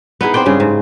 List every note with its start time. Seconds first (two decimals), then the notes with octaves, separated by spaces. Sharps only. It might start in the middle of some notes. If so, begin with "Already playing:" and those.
0.21 B3 D#4 E4 G#4
0.34 C4 C5 D5 G5
0.46 G2 C#3 G#4
0.60 G#2